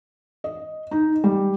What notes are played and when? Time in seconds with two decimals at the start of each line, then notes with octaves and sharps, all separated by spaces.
0.44 D#5
0.91 D#4
1.24 G3